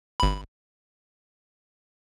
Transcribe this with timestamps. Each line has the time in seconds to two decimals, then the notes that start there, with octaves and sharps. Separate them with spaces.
0.20 G1 B5